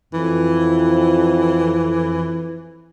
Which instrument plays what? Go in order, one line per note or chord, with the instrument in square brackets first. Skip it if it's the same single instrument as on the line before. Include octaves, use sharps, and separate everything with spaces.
[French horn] F2 [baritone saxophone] E3